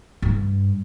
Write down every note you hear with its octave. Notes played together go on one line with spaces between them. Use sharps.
G2